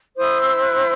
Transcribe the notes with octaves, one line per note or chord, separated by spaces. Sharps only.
E4 C5 D#6
E6
F#6